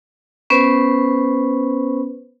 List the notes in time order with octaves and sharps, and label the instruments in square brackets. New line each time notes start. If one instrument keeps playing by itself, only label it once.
[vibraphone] B3 C#4 B4 C5